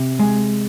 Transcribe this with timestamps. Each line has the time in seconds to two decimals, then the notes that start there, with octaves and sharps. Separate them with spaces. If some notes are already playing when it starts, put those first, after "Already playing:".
Already playing: C3
0.19 G#3